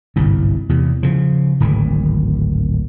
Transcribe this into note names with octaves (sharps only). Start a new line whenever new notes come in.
G1 C2 G#2
E2 C3
C#3 F3
D1 G#1 G#2 D#3